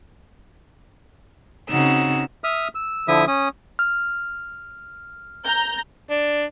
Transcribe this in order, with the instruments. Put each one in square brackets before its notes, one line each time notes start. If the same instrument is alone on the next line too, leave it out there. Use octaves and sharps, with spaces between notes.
[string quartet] C#3 C4 C#4 D#4 F#4 E6
[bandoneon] E5 D#6 F6
E6
D3 F3 E4 E5 D#6
C#4 D#6
[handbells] F6
[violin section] A#5 G6
[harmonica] D4